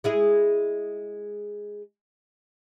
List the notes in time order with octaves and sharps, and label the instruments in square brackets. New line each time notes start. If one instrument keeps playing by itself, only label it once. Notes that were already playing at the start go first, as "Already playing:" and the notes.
[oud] G#3 E4 G#4